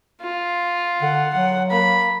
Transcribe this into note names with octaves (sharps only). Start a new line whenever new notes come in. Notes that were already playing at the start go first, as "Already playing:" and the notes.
F4
D3 F#5
F#3 F#5
A#3 B5